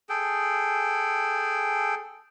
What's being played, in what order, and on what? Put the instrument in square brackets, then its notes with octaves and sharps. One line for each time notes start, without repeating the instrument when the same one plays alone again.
[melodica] G#4 A4 G5